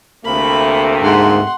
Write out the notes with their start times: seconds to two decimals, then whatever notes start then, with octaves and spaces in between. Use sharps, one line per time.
0.25 D2 C3 A3 A#3 B5
1.03 G#2 F#5 C6